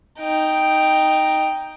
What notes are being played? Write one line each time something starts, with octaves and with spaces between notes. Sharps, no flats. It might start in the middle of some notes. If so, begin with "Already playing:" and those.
D#4 G5